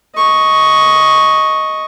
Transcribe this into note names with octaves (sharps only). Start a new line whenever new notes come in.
D#5 C#6